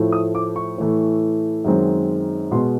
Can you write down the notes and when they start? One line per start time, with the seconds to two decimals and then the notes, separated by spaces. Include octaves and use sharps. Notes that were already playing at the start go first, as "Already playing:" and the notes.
Already playing: A2 F3 A3
0.12 D#6
0.35 D6
0.56 C#6
0.78 A2 E3 A3
1.65 F#2 D#3 G#3 C4
2.51 B2 G#3 B3 C6